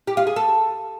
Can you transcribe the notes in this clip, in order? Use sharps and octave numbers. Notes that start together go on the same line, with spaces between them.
G4
F4
G#4
A4